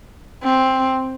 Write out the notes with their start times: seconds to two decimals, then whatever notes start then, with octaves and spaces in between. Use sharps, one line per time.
0.44 C4